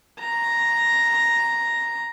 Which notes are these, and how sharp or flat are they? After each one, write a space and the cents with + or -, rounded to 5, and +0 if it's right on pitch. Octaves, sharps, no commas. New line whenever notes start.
A#5 +0